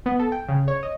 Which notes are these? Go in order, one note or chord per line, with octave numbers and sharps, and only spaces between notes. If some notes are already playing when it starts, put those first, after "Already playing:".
B3
A4
G5
C#3
C#5
D#5